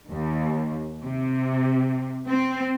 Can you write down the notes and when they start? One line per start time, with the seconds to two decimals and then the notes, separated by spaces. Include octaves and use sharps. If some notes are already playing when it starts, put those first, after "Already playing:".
0.11 D#2
1.04 C3
2.29 C4